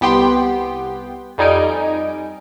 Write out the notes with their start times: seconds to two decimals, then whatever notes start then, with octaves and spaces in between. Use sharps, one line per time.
0.01 C2 B3 G4 G5 C6
1.38 F2 G3 D#4 G#5 D7